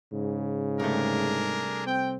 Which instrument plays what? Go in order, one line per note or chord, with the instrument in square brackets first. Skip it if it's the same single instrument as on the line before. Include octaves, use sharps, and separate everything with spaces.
[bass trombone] G#2 [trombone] C#3
[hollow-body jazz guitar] C2 A3 [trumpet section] D4 G#4 A#4
[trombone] C4 [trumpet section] G5